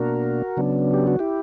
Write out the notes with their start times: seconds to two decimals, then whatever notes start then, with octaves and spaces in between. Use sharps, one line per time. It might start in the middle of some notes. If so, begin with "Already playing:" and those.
Already playing: B2 A#3 D4 F#4 A#4
0.57 C#3 F#3 B3 D4
0.94 G4
1.07 F#4
1.19 E4 G4